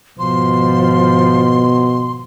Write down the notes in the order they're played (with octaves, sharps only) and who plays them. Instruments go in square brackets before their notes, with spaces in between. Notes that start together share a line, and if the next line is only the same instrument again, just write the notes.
[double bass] G#1 F3 [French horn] B2 [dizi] C6